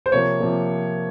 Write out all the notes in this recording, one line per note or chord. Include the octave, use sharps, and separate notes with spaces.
C5
C3 F3 A#3 C#5
C3 F3 A#3